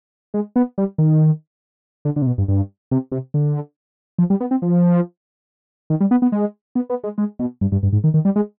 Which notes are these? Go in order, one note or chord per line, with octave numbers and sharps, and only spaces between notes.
G#3
B3
G3
D#3
D3
D3
C3
B2
G2
G2
C3
C3
D3
F3
G3
B3
C4
F3
D#3
G3
B3
B3
G#3
B3
B3
G#3
G#3
B2
G2
G2
G2
G#2
D#3
D#3
G3
G#3